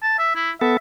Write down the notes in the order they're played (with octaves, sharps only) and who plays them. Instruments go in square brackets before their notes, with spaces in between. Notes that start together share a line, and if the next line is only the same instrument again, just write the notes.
[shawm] A5
E5
E4
[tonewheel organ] B3 A4 [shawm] E5